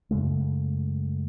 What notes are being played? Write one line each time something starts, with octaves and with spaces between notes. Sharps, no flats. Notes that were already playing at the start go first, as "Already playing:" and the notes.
F#2 C#3 G#3 A3